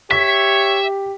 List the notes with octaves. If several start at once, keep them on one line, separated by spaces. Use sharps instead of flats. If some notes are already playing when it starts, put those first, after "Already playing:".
G4 C#5 E5 B6